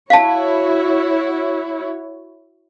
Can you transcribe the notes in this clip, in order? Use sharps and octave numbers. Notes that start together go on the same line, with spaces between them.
E4 F#4 C#5 F5 A5